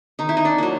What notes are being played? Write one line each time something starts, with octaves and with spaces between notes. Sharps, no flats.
D#3 D#4
E4
D#4
D4
F#3 A#3